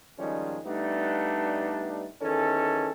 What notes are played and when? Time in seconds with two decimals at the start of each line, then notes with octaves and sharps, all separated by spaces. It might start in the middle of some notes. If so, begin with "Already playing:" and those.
0.18 D#3 F3 G3 G#3 C#4
0.65 G3 A3 B3 D4 D#4
2.21 E2 D#3 C#4 A4